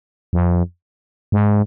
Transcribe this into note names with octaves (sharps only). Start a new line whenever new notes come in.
F2
G#2